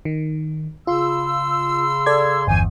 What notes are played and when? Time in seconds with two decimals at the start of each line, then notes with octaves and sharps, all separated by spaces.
0.05 D#3
0.87 C#3 F4 C6 E6
2.06 A4 D5 G#6
2.47 G1 E2 C5 G#5